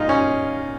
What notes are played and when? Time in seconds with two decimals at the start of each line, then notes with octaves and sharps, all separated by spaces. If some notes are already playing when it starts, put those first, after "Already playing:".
Already playing: A#2 G#3 D#4 F4
0.09 C#4